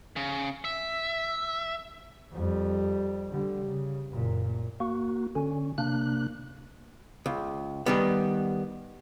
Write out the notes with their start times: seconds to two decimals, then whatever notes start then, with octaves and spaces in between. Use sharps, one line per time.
0.16 C#3
0.65 E5
2.33 F2 G3
3.31 D3 G3
3.66 C#3
4.12 F#1 A#2
4.80 A#3 F#4
5.35 D3 C#4
5.78 C3 A#3 D4 F#6
7.26 C#2
7.86 D#3 G3 B3